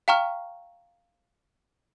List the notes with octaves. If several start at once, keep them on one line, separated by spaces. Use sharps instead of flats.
F5 G5 A#5 C#6 F6